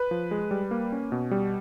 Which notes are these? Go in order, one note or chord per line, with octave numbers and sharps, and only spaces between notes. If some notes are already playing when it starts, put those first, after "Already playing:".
Already playing: B4
F3
G#3
G3
A#3
C#4
B2
G3